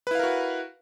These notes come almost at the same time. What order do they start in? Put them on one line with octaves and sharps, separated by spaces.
B4 E4 F5 A#4 F#4